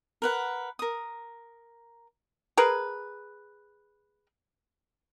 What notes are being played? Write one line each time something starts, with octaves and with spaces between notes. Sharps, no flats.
A#4 B4 F#5
A#4 D#6
G#4 A#4 B4